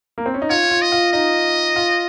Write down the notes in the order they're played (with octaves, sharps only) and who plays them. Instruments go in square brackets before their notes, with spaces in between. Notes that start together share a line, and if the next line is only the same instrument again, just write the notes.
[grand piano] A#3
C4
C#4
D#4
[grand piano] F4 [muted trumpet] C#5
[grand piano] F4
[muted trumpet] D#5
[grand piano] F4
[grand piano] D#4 [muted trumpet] D#5
[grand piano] F4